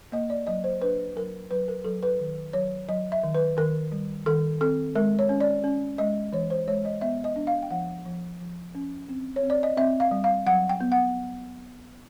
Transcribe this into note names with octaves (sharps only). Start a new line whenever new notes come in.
A#3 D#5
D5
F#3 D#5
C5
D4 B4
F#3 A#4
F#3 B4
A#4
F#3 A4
B4
D#3
F#3 C#5
F#3 D#5
E5
D#3
B4
D#3 A#4
G3
D#3 A4
C4 A4
G#3 A#4
C#5
C#4
D5
C#4
G#3 D#5
E3 C#5
C5
G#3 C#5
D#5
B3 E5
D#5
D4
F5
G5
F3 F#5
F3
F3
C#4
C4
C#5
C4
D5
D#5
C4 E5
F5
G3
F5
F#3 F#5
G5
B3
F#5